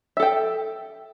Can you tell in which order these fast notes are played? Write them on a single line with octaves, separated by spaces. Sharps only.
E5 A4 G5